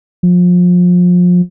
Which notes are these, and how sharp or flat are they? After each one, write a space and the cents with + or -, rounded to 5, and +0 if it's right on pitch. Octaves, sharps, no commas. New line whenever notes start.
F3 +30